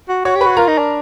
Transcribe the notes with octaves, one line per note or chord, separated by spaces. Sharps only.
F#4
F#4 C#5 C#6
G4
B4 B5
F#4
F4 A#4 A#5
D#4
D4